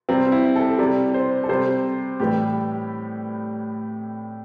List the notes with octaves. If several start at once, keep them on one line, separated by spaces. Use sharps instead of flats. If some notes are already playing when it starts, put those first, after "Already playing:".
C3 G3 C4
E4
A4
C3 G3 D5
C5
A4
C3 G3 C5
A2 E3 G3 G4